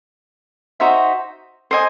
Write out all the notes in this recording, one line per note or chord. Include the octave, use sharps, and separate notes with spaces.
D#4 F#4 C5 E5
C5 D#5 G#5